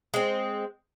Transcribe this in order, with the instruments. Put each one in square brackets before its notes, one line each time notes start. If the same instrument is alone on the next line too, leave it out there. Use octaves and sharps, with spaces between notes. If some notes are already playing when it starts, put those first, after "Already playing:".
[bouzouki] G#3 C4